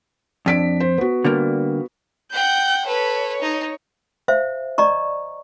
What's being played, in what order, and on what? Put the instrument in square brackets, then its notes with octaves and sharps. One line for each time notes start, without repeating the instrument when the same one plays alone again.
[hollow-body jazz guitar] F2 [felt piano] D4 B6 D7
[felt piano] C5
B3 F#4
[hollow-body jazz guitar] D3 G3 A#3
[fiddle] F#5 G5 [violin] G6
[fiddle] A4 B4 [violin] C#5
[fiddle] D#4
[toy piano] C5 E5 F5
D5 D#5 A#5 C#6